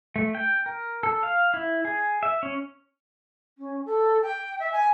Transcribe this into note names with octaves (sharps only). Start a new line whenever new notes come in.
A3
G5
A#4
A4
F5
E4
G#4
E5
C#4
C#4
A4
G5
E5
G#5